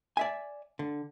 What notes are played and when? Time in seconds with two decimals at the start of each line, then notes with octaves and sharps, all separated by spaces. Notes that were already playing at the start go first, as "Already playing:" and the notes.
0.17 D5 E5 G#5
0.79 D3